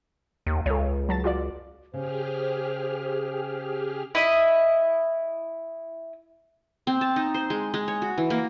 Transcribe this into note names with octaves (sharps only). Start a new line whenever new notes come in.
D#2
C#2 A4 C#5
F#3 A5 A6
F4 F#4 D5
C#3 G4 G#4 C5 F6
E4 D#5
C4
A5
D#4
C5
G#3
G#3
C#5
F#4
E3
A#3